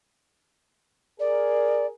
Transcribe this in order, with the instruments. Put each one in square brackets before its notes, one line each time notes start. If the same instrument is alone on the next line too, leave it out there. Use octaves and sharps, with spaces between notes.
[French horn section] G#4 A#4 [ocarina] D5